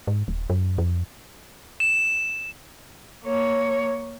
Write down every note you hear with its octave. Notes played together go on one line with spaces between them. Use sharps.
G#2
D#1
F#2
F2
E7
A#3 C#5